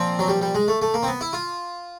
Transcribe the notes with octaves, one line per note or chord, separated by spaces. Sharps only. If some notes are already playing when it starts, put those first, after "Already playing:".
Already playing: A#2 F3 C4
F#3
G3
G3
G#3
A3
A3
A#3
C4
B3
E4
F4